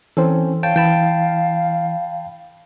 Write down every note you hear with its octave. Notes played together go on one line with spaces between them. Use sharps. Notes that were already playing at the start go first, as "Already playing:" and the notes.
E3 C4 C#4 A4 C5
C#5 F5 G5 A5
E3 G5 A5 B5